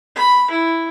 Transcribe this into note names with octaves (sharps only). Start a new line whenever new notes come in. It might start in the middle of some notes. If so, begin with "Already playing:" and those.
B5
E4